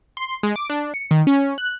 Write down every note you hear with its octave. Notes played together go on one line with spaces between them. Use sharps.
C6
G#3
D6
D4
C#7
D#3
C#4
F#6